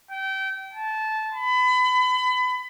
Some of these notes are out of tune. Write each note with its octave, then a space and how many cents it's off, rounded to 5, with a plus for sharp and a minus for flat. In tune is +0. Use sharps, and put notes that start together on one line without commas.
G5 -25
A5 -15
B5 +30